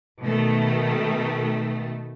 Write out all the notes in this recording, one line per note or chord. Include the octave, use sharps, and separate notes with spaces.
B2 D#3 A3